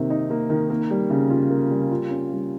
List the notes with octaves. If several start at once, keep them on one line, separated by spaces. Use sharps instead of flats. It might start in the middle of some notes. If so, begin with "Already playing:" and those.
Already playing: C3 D#3 A#3
D#4
A#3
D#3
A#3
G3
C#3
F4
A#3
G3
F4
C#4
G3